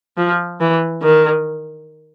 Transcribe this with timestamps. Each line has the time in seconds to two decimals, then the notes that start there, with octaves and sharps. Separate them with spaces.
0.17 F3
0.61 E3
1.02 D#3